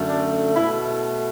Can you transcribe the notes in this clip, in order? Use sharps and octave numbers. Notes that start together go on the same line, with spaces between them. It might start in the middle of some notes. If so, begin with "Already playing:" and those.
Already playing: F#2 D3 A3
D4
B2 A3 E4